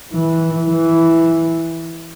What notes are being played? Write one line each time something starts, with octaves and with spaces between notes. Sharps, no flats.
E3
E3